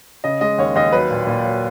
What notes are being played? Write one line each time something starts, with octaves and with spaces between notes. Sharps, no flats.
C#3 D#5
G#3 D#5
D#2 C#5
D#2 D#5
F#3 B4
A#2
A#2
F#3